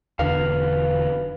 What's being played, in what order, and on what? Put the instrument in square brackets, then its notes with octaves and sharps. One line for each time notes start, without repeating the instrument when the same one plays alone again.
[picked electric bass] E1 E2 D3 [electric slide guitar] B4 F5